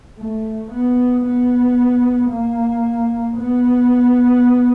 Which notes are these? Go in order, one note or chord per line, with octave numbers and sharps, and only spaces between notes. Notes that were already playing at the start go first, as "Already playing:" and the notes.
A3
B3
B3
A#3
B3